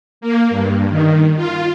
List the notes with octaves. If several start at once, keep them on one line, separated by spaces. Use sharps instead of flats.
A#3
G2
D#3
F4